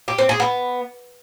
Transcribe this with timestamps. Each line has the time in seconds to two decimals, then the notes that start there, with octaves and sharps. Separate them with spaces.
0.08 G4
0.18 C4
0.29 G#4
0.40 B3